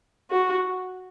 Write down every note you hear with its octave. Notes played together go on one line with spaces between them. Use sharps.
F#4